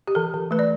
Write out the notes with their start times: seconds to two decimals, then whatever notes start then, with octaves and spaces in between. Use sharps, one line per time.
0.08 G4
0.15 E3 A4
0.34 E3
0.51 A3 B4
0.59 D5